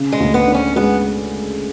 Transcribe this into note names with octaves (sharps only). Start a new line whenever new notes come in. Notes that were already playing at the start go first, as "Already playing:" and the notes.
Already playing: C#3
G#3
D2
B3
D4
C#4
G#3 B3